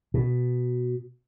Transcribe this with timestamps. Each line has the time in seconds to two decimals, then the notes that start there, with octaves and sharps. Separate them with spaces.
0.14 B2